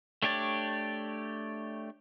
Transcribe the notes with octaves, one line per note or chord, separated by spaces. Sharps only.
A3 D4 G4 C#5 D5